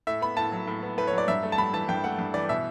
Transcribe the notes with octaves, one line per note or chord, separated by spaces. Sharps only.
A2 E5
B3 B5
A2 A5
F#3
A2
B3
A2 B4
C#5
F#3 D5
G2 E5
A3
A5
G2 B5
E3 A5
G2 G5
A3 F#5
G2
E3 D5
B2 E5